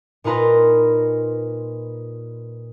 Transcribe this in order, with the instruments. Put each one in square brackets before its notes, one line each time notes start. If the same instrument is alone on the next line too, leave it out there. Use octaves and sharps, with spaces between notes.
[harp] A#2 D#4 F4 B4 A#5 C6